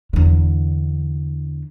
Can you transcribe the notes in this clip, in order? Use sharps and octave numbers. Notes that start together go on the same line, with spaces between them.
E2 D3